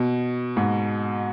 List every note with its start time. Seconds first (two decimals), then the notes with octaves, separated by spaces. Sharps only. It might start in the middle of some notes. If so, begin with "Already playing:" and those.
Already playing: B2
0.57 G#2